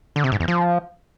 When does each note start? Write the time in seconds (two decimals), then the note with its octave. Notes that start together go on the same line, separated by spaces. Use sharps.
0.16 D3
0.24 C3
0.32 G#2
0.40 E2
0.48 F3